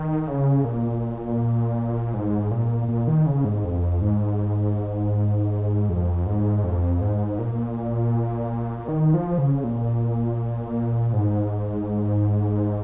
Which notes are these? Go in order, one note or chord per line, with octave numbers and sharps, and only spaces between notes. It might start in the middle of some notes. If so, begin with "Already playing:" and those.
Already playing: D#3
C#3
A#2
G#2
A#2
A#2
D#3
C#3
G#2
F2
G#2
F2
G#2
F2
G#2
A#2
D#3
F3
C#3
A#2
G#2